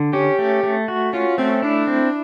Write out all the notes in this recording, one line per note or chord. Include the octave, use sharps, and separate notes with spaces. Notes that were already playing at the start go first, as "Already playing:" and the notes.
Already playing: D3
C#4 G4
A3
A3
F#4
C#4 F4
A3 C4
D4 E4
C4